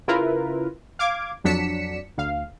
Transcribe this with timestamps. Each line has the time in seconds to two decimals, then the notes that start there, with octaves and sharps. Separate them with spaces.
0.08 C#3 E4 F4 A#4 B4
0.99 F5 D6 G#6
1.44 F2 F#3 D4 B6 C#7 E7
2.18 D2 F5